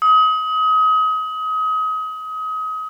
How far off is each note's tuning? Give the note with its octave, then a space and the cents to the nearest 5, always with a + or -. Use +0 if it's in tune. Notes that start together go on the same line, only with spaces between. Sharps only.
D#6 +30